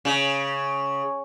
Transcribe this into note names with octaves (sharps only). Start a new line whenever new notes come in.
C#3